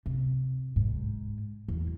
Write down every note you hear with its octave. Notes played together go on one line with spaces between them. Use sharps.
C3
G#2
E2